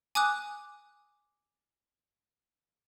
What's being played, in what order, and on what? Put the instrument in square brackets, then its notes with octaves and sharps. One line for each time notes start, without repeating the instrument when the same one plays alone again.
[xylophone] G#5 D6 D#6 F#6